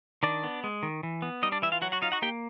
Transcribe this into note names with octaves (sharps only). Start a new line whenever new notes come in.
D#3 D4 D5
B3
G#3
D#3
E3
B3
G3 D#4 D#5
D4 D5
E3 E4 E5
F4 F5
F#3 F#4 F#5
F#4 F#5
D#4 F4 F5
F#4 F#5
A#3 G4 G5